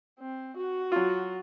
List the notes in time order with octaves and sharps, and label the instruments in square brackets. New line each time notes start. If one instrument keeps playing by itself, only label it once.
[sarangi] C4
F#4
[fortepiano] F#3 F4